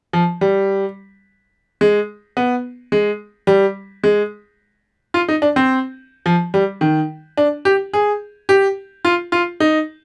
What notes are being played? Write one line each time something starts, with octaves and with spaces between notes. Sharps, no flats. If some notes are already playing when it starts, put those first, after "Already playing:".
F3
G3
G#3
B3
G#3
G3
G#3
F4
D#4
D4
C4
F3
G3
D#3
D4
G4
G#4
G4
F4
F4
D#4